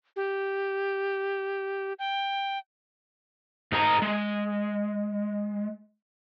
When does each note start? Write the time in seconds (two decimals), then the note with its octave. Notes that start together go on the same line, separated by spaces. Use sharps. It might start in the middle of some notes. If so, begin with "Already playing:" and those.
0.16 G4
1.99 G5
3.72 G#2 D#4 G#4 A#4 A#5
4.02 G#3